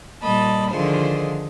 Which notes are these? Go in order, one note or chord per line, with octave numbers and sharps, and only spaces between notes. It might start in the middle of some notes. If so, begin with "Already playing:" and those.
A#2 G3 D#5 A5 B5
D3 D#3 F3 F4 G#4 C5